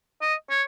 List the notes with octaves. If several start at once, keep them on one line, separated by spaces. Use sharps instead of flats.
D#5
C#5